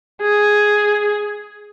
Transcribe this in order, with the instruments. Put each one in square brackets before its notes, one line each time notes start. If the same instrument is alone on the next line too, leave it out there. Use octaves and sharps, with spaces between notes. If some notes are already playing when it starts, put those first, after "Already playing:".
[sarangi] G#4